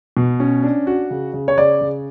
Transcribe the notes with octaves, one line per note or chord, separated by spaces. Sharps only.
B2
C#4
D4
F#4
C#3
C#3
C#5
C#3 D5
C#3